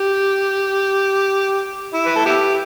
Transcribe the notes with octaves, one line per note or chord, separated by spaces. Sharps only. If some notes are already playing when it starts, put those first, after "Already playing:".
Already playing: G4
E4
B4
A4
B3 E4 G4